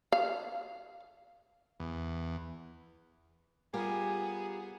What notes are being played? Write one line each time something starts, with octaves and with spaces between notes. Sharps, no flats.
F5
E2
G3 B3 F4 G4 G#4 A#4 G#5